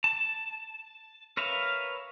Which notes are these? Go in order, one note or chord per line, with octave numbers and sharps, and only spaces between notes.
A5
A#4 B4 C#5 E5 F5